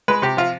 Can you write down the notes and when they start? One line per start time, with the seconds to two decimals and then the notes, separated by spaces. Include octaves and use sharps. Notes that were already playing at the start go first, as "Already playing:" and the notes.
0.08 G#3 B4
0.22 C3 G4
0.37 F3 F4